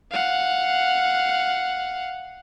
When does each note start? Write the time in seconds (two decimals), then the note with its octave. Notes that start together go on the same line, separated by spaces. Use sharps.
0.11 F5 F#5